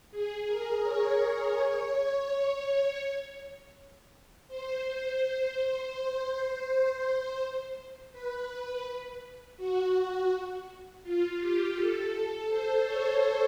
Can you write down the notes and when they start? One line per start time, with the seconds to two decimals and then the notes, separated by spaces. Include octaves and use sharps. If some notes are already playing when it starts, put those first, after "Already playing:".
0.11 G#4
0.47 A#4
0.83 C#5
1.57 C#5
4.48 C5
5.93 C5
8.12 B4
9.57 F#4
11.03 F4
11.39 G4
11.75 A4
12.49 C5
12.85 C#5